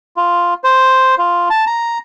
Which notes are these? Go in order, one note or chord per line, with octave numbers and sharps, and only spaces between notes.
F4
C5
F4
A5
A#5